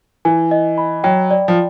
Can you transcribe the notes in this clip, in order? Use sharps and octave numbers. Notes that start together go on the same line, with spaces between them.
E3 G#5
D#5
B5
F#3 G5
D5
F3